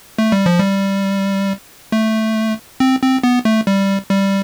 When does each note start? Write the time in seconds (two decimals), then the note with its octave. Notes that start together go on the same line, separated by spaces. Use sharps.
0.18 A3
0.32 G3
0.46 F3
0.60 G3
1.92 A3
2.80 C4
3.02 C4
3.24 B3
3.45 A3
3.67 G3
4.10 G3